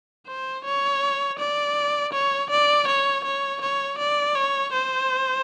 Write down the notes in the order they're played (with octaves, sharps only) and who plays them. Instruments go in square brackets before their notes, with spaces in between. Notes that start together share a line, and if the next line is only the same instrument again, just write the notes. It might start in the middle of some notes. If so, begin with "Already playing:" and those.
[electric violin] C5
C#5
D5
C#5
D5
C#5
C#5
C#5
D5
C#5
C5